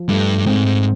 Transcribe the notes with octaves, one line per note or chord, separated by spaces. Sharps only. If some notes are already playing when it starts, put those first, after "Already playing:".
Already playing: F3
G2 A3
G#2 C4